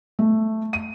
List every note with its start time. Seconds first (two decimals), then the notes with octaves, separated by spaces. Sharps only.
0.19 A3
0.73 D#7